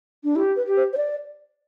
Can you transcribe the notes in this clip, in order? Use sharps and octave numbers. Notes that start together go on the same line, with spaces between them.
D4
E4 G4
B4
G4
C5
C5
D5